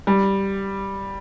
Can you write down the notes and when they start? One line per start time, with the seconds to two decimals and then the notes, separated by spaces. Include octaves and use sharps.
0.07 G3